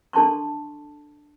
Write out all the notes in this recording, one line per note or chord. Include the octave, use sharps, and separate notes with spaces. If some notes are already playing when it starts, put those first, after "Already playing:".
D4 A4 A5 C6 C#6